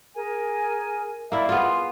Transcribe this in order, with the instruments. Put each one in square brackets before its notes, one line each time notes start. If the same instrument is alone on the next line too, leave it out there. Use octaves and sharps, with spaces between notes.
[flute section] G#4 A#4 G#5
[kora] A#3 E4 [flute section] D5 E5
[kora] B3 F4 [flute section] G#4 C6